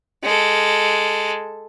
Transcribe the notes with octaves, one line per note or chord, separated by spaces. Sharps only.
G#3 A4